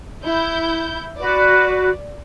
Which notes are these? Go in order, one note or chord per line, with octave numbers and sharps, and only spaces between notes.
E4 G6
F#4 B4 D5